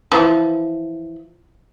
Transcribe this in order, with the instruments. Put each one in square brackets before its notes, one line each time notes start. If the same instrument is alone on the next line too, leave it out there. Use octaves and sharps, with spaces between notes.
[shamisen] E3 F3